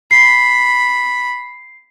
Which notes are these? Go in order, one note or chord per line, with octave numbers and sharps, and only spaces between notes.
B5 C7